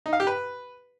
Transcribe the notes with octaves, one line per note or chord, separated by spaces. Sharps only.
D#4
F5
G4
B4